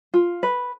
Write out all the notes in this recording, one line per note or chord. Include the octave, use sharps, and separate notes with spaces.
F4
B4